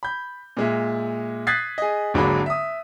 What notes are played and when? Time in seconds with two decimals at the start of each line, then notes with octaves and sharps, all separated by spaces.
0.03 B5 G6
0.57 A#2 G#3 E5
1.47 D#6 F#6 G#6 A6 B6 C7
1.78 G#4 D#5
2.14 G#1 D3 F#3 G#3 A#3 B5
2.46 E5 D#6